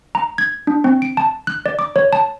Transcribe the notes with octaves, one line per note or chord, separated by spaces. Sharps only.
A#5
G#6
D4
C4
D7
A5
F#6
D5
D6
C#5
A5